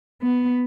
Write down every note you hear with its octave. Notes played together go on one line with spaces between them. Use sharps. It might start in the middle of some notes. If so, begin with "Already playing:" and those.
B3